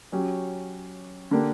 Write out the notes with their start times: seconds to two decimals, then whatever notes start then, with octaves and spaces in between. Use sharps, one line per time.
0.12 F#3 C#4 G4
1.31 D3 A#3 D4 G4